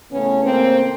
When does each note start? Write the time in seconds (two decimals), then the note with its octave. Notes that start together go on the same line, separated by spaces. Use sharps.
0.11 C#3 E3 A3 B3 C#4
0.45 A#3 C4